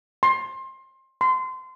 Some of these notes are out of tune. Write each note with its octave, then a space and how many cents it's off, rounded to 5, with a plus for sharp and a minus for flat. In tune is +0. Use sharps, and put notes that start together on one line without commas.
C6 +25
C6 -25